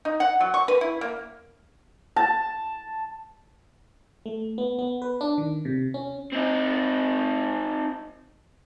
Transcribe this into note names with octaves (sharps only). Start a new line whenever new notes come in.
D#4
F#5
F#3
C#6
B4
E4
A#3
A5
A3
B3
B3
B4
D4
D#3
C3
C#4
C4 D#4